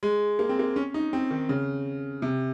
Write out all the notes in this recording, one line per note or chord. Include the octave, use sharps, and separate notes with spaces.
G#3
A#3
C4
A#3
C#4
D#4
C4
D#3
C#3
C3